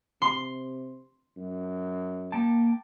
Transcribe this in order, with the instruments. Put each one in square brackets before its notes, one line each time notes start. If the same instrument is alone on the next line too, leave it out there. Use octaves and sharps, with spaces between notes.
[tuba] C3 [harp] C6
[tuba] F#2
[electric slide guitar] A#3 G5 A5